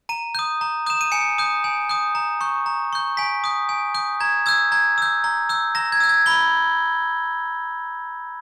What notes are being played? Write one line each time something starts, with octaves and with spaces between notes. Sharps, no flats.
A#5 D#7
D#6 G6
A#5
D#6 G6 E7
D#7
G#5 C#7
D#6 G6
G#5
D#6 G6
A#5
C#6 G6
A#5
C#6 G6
G#5 B6
D#6 G6
G#5
D#6 G6
A#5 G#6
E6 G6 G#6
A#5 G#6
E6 G6
A#5
E6 G6
A#5 A#6
G#6
E6 G6
G#6
B5 G7